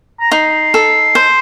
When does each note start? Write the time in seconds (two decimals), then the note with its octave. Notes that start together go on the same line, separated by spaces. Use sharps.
0.20 A#5
0.31 D#4 C6
0.74 A4
1.15 C5